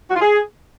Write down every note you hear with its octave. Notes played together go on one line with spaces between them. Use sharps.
F#4
F4
G#4